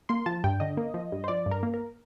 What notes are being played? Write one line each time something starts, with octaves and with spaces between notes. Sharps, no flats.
A#3 C6
F3 A5
G2 G5
D3 D#5
A#3
F3
G2
C5
F3 D5
G2
A#4
A#3
A#4